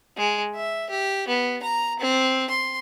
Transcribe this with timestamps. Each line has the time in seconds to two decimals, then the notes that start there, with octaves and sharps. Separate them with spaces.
0.17 G#3
0.55 E5
0.90 G4
1.28 B3
1.63 A#5
2.00 C4
2.50 C6